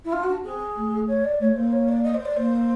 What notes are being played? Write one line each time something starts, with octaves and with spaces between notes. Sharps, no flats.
E4
D4 F4
F#4
D4
C4 G#4
A3
C#5
D5
A3 C#5
A#3 C5
C#5
D5
D#5
C5
D5
A#3 C5